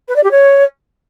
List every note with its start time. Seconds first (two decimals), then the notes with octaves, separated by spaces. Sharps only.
0.08 B4
0.16 D5
0.24 G4
0.31 C#5